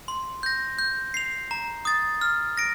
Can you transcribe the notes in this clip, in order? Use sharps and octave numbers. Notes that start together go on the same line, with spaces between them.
C6
G6 A#6
G6
C7 F7
A#5
D#6 A6
F6
A#6 D7